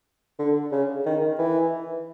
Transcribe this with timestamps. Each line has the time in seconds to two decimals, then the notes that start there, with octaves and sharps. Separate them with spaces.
0.39 D3
0.72 C#3
1.06 D#3
1.38 E3